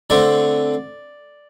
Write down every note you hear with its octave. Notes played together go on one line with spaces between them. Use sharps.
D3 A3 C4 D5